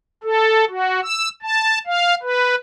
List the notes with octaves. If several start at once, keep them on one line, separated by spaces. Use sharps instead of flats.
A4
F#4
E6
A5
F5
B4